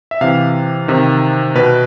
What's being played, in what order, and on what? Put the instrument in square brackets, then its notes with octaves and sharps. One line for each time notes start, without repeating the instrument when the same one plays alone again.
[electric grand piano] E5
C3 E3 F5
C3 D#3
B2 B4